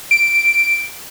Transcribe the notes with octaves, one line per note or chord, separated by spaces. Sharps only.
D7